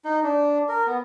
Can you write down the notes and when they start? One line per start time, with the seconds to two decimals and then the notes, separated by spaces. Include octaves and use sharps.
0.05 D#4
0.23 D4
0.69 A#4
0.87 B3